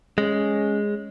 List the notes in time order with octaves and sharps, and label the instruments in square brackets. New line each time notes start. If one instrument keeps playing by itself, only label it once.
[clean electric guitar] G#3 [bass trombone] C#4